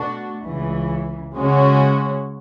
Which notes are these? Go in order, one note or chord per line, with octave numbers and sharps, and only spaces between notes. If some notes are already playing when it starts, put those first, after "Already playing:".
Already playing: B2 A3 D4 F#4
C#2 C#3 E3
C#3 G#3 C#4 F#4